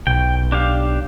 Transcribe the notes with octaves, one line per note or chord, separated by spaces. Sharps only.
B1 G5
D4 G4 F5